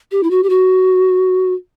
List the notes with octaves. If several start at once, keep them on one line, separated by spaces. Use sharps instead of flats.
G4
E4
F#4
G4
F#4